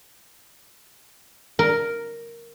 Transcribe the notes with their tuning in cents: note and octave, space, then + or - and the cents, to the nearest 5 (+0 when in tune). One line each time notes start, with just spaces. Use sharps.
A#4 +0